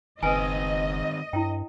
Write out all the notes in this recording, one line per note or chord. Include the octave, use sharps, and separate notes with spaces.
F#1 D#3 C4 B4 D#5 G#5
G2 E4 C#5 G5